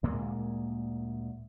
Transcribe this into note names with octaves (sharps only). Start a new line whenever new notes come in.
D2 A#2 G#3 A#3